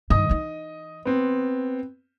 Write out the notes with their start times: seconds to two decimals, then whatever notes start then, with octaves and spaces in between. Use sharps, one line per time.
0.10 G2 D#3 D#5 D#6
0.29 E3 D#4
1.05 B3 C4